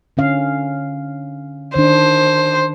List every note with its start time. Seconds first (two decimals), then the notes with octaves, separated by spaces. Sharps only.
0.17 D3 C#4 F5
1.76 D#3 D4 C5